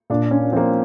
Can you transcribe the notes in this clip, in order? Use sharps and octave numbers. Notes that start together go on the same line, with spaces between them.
A#2 D4
C#4
F3 A#3 C4